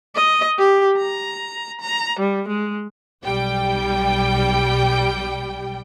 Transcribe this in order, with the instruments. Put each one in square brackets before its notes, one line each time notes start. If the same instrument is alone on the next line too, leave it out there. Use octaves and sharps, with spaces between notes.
[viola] D#5
G4
A#5
A#5
G3
G#3
[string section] B1 G3 G5